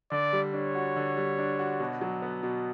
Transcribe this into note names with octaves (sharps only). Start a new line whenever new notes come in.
D3 D5
G3
D4 C#5
F#4
D3
G3
D4
F#4
B2
F#3
B3
B2